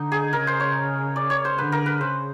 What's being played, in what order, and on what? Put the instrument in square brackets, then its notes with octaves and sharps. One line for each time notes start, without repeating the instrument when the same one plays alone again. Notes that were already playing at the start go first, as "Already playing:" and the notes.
Already playing: [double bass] D3 [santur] D#4
[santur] G#4
[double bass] C#3 [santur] A#4
[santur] C5
C#5
D5
C#5
C5
[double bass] D3 [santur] B4
[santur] A#4
B4
[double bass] C#3 [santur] C5